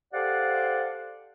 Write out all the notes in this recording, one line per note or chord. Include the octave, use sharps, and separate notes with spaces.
G4 A4 C5 D5 F5 F#5